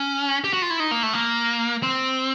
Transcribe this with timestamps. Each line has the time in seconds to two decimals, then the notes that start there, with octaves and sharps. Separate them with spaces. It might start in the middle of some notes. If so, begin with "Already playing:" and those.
Already playing: C#4
0.44 G4
0.53 F#4
0.62 F4
0.70 E4
0.80 D#4
0.91 A#3
1.03 A3
1.13 A#3
1.83 C4